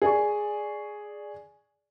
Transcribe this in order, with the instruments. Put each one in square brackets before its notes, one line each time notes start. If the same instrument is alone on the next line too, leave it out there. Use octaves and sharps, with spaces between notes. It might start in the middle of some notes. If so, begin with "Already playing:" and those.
[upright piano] G#4 D5 G#5 C#6